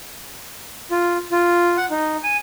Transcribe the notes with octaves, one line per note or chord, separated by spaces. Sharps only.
F4
F4
F#5
D#4
G#5